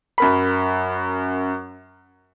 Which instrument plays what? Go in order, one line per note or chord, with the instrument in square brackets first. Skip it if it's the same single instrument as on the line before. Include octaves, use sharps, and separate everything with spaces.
[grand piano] F#2 A#4 B5